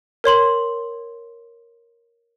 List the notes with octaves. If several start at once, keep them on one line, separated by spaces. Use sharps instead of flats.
A#4 C#5 C6 F#7